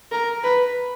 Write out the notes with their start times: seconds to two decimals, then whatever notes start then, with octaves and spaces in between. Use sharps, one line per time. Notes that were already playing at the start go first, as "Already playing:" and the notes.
0.12 A#4
0.44 B4